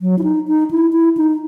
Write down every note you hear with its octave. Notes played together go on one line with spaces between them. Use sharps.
F#3
E4
D#4
D#4
E4
E4
D#4